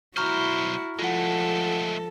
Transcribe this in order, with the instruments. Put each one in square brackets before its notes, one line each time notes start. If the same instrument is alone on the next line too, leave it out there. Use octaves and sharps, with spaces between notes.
[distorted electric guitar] B1 C5 [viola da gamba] E4 F#4 [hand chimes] A#5 C#6 F6
[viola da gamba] F3 A4 [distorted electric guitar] G#3 A3 [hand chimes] F4 F#5